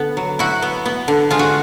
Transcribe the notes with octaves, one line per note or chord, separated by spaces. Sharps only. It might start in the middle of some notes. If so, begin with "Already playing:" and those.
Already playing: D3 B3
F#3
E4 F#4
B3
B3
D3
G#3 F4
F#4